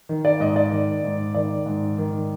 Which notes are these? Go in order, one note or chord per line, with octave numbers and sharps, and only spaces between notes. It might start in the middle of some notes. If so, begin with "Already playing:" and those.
D#3
D5
G#2 D#5
D5
D#3
G#2
D#3 D5
G#2
D#3